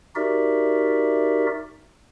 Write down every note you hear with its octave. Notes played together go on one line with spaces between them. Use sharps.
D#4 F#4 G4 A#4 D5 E5